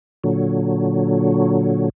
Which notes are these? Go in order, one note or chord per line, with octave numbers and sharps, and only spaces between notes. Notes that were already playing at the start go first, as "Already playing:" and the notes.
A#2 D3 F#3